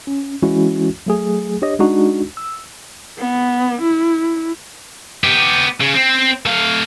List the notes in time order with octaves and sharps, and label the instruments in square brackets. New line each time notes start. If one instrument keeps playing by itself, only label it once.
[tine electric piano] C#4
E3 G#3 C#4 E4 F#4
F#3 A3 G#4
D4 G4 C#5 D#5
G#3 D4 D#4 F#4
E6
[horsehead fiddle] B3
E4
[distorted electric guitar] B3 G4
C#3
C4
A3 F5